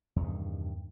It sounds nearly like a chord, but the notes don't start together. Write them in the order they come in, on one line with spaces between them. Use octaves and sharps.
E2 C3 D#3 G2